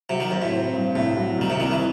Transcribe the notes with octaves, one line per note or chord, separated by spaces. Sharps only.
C3 F#3
D#3
F#2 C4
A2
C4
G2
C2 A2
F#3
C2 D#3
C3
C2 D#3
E3